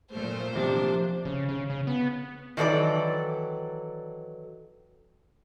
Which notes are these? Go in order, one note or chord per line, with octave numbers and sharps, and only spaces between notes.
A#2 A3 C5
C3 F3 A#3 D4
C#3
C#3
C#3
B3
D#3 E3 F#3 A4 D5